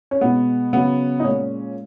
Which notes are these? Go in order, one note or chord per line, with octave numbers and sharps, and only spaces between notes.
C#4
B2 G#3 B3
C#3 F#3 B3
D#4
A#2 G#3 C#4